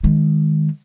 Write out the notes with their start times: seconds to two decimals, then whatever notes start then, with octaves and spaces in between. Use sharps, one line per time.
0.03 D#3 G#3